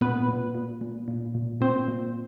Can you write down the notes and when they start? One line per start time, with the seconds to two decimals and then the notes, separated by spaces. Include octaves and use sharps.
0.01 A#2 B3 B4
0.29 A#2
0.55 A#2
0.81 A#2
1.08 A#2
1.35 A#2
1.61 A#2 C4 C5
1.88 A#2